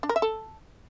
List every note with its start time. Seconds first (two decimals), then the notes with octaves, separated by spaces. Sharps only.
0.03 D4
0.09 A#4
0.16 E5
0.22 A4